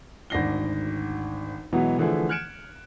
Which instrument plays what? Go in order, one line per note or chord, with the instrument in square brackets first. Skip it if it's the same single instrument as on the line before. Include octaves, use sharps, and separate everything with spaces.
[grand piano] G#1 D2 D4 A#6 C7 G7
B2 E3 F#3 G#3 B3
D3 E3 F3 A3 G#4
F6 F#6 G#6 C#7 D7 E7